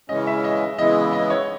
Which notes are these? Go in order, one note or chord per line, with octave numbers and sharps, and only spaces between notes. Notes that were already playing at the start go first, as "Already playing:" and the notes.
C#3 E3 G#3 C#4 D#5
E5
D#5
C#3 E3 G#3 B3 E4 D#5
D#5
C#5